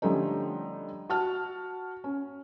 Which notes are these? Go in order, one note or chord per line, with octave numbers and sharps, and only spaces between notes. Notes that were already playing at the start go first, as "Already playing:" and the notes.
D3 F3 G3 A3 C#4 D#4
F#4 A5 F6
C#4